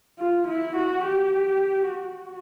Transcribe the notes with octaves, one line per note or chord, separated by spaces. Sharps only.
F4
E4
F#4
G4
F#4